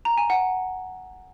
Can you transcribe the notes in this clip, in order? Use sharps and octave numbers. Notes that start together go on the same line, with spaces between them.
A#5
G#5
F#5